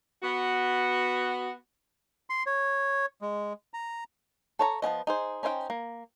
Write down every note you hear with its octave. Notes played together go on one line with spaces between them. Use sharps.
B3 F#4
C6
C#5
G#3
A#5
A4 C#5 A#5
F3 B3 C#4 D#5
D#4 G#4 C5
C#4 D#4 C5 F5 G5
A#3